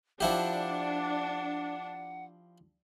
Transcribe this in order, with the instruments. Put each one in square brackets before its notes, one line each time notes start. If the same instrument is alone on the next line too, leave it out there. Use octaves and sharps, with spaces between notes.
[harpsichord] F3 E4 G4 [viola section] D4 [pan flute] F#5